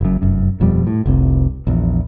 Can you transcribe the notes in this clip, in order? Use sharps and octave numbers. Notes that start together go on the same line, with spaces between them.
F#1 F#2
F1 F#2
D#1 F2 B2 G3
A2
F1 C2 C3
A#1 E2